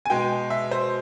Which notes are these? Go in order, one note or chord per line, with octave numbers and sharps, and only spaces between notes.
G#5
B2 G#3 G5
E5
C5